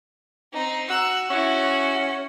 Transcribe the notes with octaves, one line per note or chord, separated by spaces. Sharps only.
C4 D#4
F#4 E6 F#6
C#4 E4 F#4